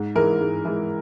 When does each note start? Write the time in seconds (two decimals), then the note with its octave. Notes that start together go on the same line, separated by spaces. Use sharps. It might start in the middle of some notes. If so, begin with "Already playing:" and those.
Already playing: G#2
0.15 E3 G#3 A#4
0.40 G#2
0.65 E3 G#3